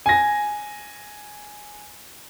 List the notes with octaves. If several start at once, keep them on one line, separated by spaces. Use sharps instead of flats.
G#5 A#6